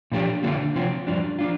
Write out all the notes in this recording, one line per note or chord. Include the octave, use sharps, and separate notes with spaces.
A#2 F3 D4 G4
D3 A#3 D4 F4
C3 F3 C4 F4
G2 F3 D4
F3 D4 F4